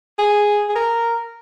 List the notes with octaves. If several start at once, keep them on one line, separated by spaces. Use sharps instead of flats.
G#4
G#4
A#4